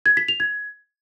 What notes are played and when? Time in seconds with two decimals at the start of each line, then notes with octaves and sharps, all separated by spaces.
0.06 G#6
0.17 B6
0.28 F7
0.40 G#6